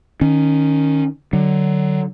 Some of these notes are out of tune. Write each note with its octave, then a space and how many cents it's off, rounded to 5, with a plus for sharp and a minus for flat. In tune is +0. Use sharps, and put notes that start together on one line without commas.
D#3 -10 C#4 +0
D3 +25 F#3 +25